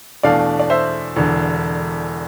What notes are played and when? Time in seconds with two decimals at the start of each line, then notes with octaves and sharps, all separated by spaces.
0.23 E2 B2 A3 D4 D5 F5
0.59 D5
0.70 C5 E5
1.16 E1 E2 D3